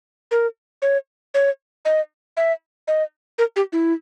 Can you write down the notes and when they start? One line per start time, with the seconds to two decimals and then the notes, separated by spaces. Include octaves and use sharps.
0.31 A#4
0.82 C#5
1.34 C#5
1.85 D#5
2.37 E5
2.88 D#5
3.38 A#4
3.56 G4
3.72 E4